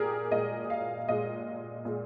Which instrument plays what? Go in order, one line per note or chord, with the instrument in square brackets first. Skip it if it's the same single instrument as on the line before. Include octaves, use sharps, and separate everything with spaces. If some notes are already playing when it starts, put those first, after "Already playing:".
Already playing: [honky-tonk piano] A#2 G4 G#4 A#4
A#2 G#3 D#5
F5
A#2 G#3 D#5
A#2 G#3